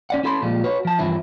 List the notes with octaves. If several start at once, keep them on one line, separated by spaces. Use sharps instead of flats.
C#4 D5 F#5
C#4 E4 A4 B5 C6
A#2 F3 G3 G#3
F#4 B4 C#5
F3 A5
G2 E3 F3 C4 E4